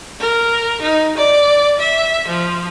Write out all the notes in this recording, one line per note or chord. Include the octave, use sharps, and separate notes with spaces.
A#4
D#4
D5
E5
F3